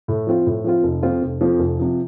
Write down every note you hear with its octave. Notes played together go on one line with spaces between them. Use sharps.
A2
F3 C4 F4
A2
F3 C4 F4
F1
F2 F3 C4 F4
F1
F2 F3 C4 F4
F1
C3 F3